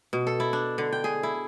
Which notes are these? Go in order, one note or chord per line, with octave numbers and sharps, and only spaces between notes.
B2
A4
E4
D4
D3
G5
G#4
E4